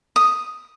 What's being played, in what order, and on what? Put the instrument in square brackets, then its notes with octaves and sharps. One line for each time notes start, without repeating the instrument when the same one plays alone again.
[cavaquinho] D#6